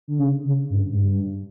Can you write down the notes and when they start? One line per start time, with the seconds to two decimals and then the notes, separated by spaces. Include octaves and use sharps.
0.08 D3
0.19 C#3
0.45 C#3
0.70 G2
0.91 G#2
0.96 G2